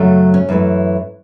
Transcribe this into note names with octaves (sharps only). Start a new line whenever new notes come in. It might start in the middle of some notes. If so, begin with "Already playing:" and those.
Already playing: F#2 C#3 F#3 A3
C#4
F#2 E3 A3